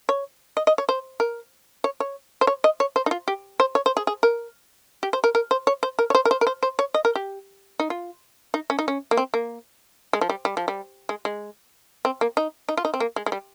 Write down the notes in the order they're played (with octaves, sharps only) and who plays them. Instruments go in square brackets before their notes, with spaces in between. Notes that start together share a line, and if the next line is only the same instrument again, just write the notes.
[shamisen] C#5
D#5
D#5
C#5
C5
A#4
C#5
C#5
C5
C#5
D#5
C#5
C5
D#4
F4
G4
C5
C#5
C5
G#4
G#4
A#4
G4
C5
A#4
A#4
C5
C#5
C5
A#4
C#5
C5
A#4
C5
A#4
C5
C5
C#5
D#5
A#4
G4
D#4
F4
D#4
C#4
D#4
C#4
A#3
C4
A#3
G#3
F3
G3
G3
F3
G3
G#3
G#3
C4
A#3
D#4
D#4
F4
D#4
C4
A#3
G#3
G#3
G3